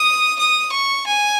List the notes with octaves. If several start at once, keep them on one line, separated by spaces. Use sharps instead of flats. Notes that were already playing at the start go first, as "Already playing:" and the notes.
Already playing: D#6
D#6
C#6
G#5